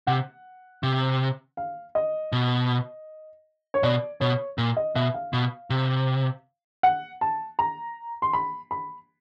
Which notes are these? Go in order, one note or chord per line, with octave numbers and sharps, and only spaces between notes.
C3 F#5
C3
F5
D#5
B2
C#5
B2 D5
B2 C#5
A#2
D#5
B2 E5
F5
B2
C3
F#5
A5
A#5
C6
B5
B5